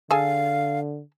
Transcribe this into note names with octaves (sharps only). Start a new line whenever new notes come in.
D3 G#4 A4 F5 G#5